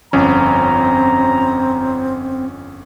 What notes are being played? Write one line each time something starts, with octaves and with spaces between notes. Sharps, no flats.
G1 F2 C4 C#4 A#5